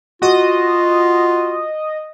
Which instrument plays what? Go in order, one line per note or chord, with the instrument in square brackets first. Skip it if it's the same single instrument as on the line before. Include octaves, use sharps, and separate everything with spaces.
[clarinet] F4 [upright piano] F#4 [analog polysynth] D#5